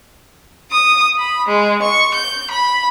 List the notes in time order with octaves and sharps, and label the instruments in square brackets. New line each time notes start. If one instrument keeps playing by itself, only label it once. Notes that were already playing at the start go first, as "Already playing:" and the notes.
[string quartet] D#6
B5
G#3
C#6
G6
B5